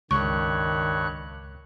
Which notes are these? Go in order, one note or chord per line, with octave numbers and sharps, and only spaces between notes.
C#2 G2 D#3 C#5 C#6 F#6